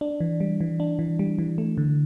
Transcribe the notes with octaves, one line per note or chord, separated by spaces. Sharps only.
D4
E3
G3
E3
D4
E3
G3
E3
A3
D3